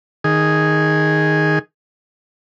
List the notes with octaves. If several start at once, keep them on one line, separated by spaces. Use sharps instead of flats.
D#3 G#4